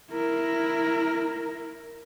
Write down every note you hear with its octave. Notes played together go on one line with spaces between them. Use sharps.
E4 A#4